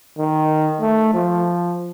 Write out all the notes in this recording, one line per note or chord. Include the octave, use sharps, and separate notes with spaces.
D#3
A3
F3